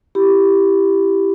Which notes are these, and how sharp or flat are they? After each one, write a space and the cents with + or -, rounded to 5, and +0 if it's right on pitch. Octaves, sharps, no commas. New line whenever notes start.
E4 +15 G4 +0 B5 +10